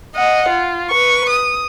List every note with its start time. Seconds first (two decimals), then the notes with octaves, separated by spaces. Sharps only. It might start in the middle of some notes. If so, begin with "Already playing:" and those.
0.16 D#5 F#5
0.49 F4
0.90 B4 C#6
1.30 D#6